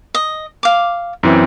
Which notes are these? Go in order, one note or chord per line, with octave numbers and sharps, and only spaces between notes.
D#5
F5 D6
F#2 E3 C4